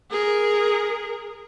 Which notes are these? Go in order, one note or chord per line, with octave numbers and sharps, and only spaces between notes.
G#4 A#4